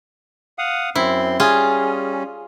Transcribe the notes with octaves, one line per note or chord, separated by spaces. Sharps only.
F5 F#5 D#6
F#2 C4 E4 C6
G3 C#4 F4 G#4